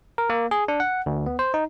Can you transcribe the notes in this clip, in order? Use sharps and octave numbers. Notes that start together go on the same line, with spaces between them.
A#4
A#3
G#4
D4
F#5
D2
B3
C5
D#4